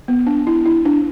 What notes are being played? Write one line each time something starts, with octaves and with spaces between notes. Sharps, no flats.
B3
D4
E4
E4
D4